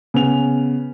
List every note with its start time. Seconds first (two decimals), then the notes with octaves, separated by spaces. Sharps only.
0.14 C#3 B3 F7